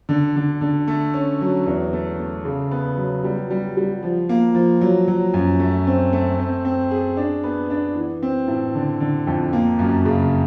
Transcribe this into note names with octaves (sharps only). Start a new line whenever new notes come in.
D3
D3
D3
A3
C#4
F#3
E2
A3
A3
C#3
B3
F#3
G3
G3
G3
F3
A#3
F3
F#3
F#3
F#2
A3
C4
A3
C4
C4
G#4
D4
B3
D4
E3
C4
A2
D3
D3
F2
A#3
F#2
C#3